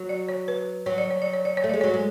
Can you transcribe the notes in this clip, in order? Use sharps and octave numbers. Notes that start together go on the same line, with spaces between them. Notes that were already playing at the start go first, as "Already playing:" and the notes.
Already playing: F#3
D5
C#5
B4
F#3 C#5
D5
C#5
D5
C#5
D5
C#5
A3
G#3 D5
F#3 C#5
G#3